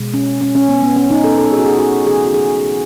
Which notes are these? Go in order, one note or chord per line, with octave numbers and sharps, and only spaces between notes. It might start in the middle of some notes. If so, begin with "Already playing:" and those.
Already playing: B2 G#3
C#4
C#4
C#4
B3
B3
C#4
D#4
A4
A4
G#4
F#4
G#4
F#4
C#3 E3 A3 G#4
F#4
G#4